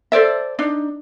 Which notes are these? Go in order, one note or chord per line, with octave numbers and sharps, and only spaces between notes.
A4 C5 D5 E5
D4 D#4